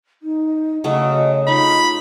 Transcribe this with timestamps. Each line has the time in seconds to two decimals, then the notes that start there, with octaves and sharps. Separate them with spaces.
0.22 D#4
0.84 C#3 F#3 A3 D#5
1.48 D#4 F4 B5